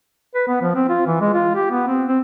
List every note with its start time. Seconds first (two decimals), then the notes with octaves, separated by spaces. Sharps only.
0.35 B4
0.47 B3
0.62 F3
0.75 C4
0.89 F4
1.06 E3
1.21 G#3
1.34 F4
1.55 G4
1.71 B3
1.87 C4
2.08 C4